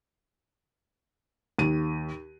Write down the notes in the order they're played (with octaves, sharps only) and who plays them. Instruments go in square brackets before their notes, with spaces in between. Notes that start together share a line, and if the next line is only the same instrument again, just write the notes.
[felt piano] D#2 D#7